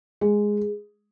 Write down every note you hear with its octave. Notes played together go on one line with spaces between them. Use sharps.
G#3 G#4